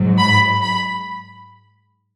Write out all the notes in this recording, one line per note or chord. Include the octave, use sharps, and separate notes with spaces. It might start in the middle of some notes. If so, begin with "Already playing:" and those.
Already playing: G#2 F#3
B5
B5